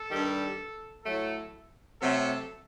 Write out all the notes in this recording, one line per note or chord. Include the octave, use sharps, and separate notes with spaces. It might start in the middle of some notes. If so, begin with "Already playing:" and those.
Already playing: A4
G2 D#3 G3
A2 F#3 A3 A4
C3 F#3 A3 A4